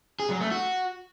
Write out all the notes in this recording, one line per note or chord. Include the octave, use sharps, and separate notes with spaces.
G#4
F#3
A3
F#4